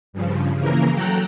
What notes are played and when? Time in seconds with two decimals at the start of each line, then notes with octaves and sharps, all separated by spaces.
0.13 G2 C#3 F3
0.58 C#3 E3 A#3 A#4
0.93 F#3 A4 G5 A#5 F#6